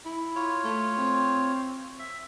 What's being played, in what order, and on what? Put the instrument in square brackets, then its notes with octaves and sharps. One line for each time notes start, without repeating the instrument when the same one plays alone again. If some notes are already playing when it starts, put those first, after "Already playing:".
[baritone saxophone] E4
[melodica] F4 C#5
[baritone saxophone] A3
C4
[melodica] E5